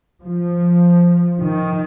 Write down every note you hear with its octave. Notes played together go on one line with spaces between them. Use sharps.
F3
D#3